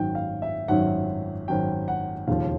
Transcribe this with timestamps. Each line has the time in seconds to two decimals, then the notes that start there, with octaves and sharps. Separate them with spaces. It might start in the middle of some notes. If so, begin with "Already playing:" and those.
Already playing: G#1 F#2 D#3 F#3 G5
0.15 F5
0.42 E5
0.68 G#1 F#2 D#3 F#3 F#5
1.48 G#1 F#2 D#3 F#3 G5
1.88 F#5
2.28 E1 D#2 C#3 F3 F5